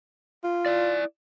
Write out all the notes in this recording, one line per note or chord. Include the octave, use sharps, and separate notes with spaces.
F4
E4 D5